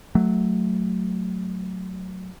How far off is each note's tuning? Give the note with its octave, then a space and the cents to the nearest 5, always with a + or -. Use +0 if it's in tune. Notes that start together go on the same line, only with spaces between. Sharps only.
F#3 +0 A3 -5